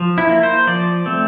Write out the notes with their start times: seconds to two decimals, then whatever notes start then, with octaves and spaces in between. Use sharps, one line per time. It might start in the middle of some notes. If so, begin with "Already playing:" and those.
Already playing: F3
0.18 E4
0.29 A#3
0.43 C5
0.67 F3 D5
1.06 A3 C4